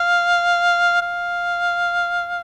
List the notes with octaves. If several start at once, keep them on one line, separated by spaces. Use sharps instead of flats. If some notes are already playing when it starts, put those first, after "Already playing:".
Already playing: F5
F5